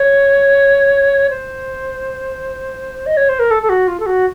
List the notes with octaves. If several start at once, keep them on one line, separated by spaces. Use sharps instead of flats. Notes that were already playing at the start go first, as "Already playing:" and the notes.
Already playing: C#5
C5
D#5
C#5
C5
A#4
A4
A4
F#4
F4
A4
F#4